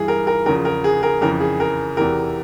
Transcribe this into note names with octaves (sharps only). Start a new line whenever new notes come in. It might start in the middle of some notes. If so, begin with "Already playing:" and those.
Already playing: G2 E3 G#4
A#4
A#4
E2 C#3 F3 A#4
A#4
G#4
A#4
F2 C#3 E3 A#4
G#4
A#4
E2 C3 E3 A#4